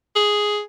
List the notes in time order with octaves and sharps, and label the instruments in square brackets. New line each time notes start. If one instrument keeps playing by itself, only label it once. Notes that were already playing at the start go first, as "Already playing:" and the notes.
[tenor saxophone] G#4